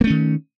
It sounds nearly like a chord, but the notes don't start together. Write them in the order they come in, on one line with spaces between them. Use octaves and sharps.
A#3 A3 C#4 D#3